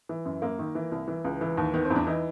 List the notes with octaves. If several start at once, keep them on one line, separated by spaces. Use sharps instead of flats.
E3
F#2
F#2 A#3
D#3
E3
C2
E3
C#2
E3
D#2
D#3 B3
C4
E2
D4
E3 D#4